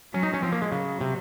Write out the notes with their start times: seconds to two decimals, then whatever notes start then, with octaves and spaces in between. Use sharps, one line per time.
0.14 F#3 C#4
0.23 D#4
0.34 C#4
0.43 F3 C4
0.52 A#3
0.62 G#3
0.72 C#3 F#3
1.01 C3